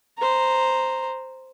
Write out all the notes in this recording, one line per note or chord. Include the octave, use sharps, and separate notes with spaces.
C5 A#5